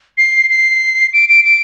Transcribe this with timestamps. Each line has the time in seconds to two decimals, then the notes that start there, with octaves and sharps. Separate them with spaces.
0.18 C7
0.50 C7
1.13 D7
1.29 D7
1.44 D7